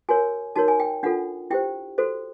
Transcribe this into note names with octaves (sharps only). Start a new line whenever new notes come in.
F#4 A#4 C#5 G#5
D#4 F#4 A#4 C#5 A5
G#5
G5
D4 F4 A4 F#5
E4 G4 C5 G5
F#4 A4 C5